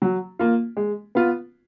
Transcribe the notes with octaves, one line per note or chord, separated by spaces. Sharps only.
F#3
A#3 F4
G#3
B3 F4